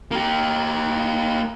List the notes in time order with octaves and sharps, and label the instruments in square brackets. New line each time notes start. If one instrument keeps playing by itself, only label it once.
[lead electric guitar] A#3 G4